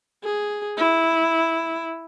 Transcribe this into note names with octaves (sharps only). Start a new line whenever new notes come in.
G#4
E4